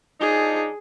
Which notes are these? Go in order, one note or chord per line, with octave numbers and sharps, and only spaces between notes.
F3 D4 D#4 G#4